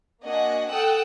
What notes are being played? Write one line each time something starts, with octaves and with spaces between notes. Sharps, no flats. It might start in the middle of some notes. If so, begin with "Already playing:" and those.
A#3 D4 F#4 D#5 F#5 G#5
A4 F#5 G5 D#6 E6 F#6